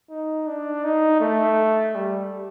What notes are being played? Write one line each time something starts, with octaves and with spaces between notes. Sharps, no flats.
D#4
D4
D#4
A3
G3